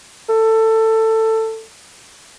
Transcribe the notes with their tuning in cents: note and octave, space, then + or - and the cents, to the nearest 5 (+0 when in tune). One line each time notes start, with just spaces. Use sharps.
A4 +15